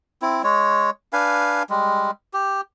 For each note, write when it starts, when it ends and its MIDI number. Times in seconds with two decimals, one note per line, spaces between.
0.22 0.42 60
0.22 0.42 64
0.44 0.90 56
0.44 0.90 73
1.13 1.63 62
1.13 1.63 71
1.13 1.63 77
1.13 1.63 80
1.70 2.11 55
1.70 2.11 56
2.33 2.61 67